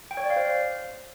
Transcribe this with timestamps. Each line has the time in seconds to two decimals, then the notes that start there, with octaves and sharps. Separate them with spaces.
0.11 G5
0.17 C#5
0.24 D5
0.30 F5
0.36 C5